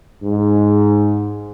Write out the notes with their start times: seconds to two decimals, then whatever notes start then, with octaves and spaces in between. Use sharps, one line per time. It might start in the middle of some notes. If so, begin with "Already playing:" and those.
0.23 G#2